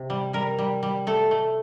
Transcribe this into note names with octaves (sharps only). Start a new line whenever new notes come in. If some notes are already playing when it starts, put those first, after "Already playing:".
Already playing: C3
G3
G3 A#4
G3
G3
A3 A4
A3